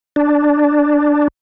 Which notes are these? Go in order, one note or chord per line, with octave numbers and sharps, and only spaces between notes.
D4